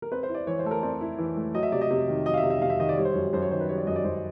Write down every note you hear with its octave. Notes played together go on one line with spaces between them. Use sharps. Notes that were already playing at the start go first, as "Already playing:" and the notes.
A#4
C4 B4
C5
E4
D5
E3 C#5
C5
A3 A4
A#4
C4 D5
E4
E3
A3
F#3 D#5
E5
C3 D5
D#5
C3
D#3
F#3 D#5
F5
E5
C3
E5
C3 F5
E5
D#3 D#5
D5
G3 C#5
C5
F#2 C#5
F#2 C5
C#5
D#3 C5
B4
G3 C#5
D5
F#2 D#5
D5
F#2 C5